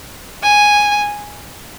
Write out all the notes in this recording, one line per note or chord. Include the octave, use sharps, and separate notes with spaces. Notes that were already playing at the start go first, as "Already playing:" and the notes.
G#5